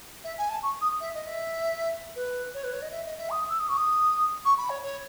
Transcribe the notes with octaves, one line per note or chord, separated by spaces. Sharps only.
E5
G#5
A5
C#6
D#6
E5
D#5
E5
B4
C#5
B4
C#5
D#5
E5
D#5
E5
D#6
E6
D#6
C#6
D#6
C#6
B5
C#5
C#5